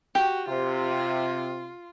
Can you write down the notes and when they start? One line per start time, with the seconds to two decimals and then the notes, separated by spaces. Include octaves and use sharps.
0.15 F#4 G4
0.48 C3 F4